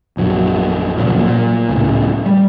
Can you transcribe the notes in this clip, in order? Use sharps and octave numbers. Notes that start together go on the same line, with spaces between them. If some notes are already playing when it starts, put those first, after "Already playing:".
A#1 F#2 F#3
C#2 A#2 F3 F#3
A#2
C#2 A2
G3